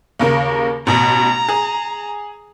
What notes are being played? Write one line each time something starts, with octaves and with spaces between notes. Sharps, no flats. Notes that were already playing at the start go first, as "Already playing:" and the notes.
D#2 C#3 A#4
A1 B2 A#5
G#4